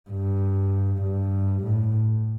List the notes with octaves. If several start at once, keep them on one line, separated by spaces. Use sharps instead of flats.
G2
G2
A2